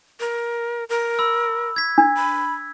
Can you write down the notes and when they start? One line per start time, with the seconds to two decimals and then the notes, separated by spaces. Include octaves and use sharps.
0.20 A#4
0.89 A#4
1.19 B5 E6
1.76 G#6 B6
1.98 D4
2.16 B5